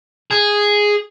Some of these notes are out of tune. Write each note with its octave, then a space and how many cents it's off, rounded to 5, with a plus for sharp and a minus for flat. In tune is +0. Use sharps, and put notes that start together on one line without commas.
G#4 -5